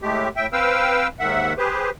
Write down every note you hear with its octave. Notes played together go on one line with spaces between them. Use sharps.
A2 G#3 A3 G4
A2 E5 G5
C4 B4 F5 G5 E6
D#2 G#2 D#3 E5 F#5
G4 G#4 B4 C5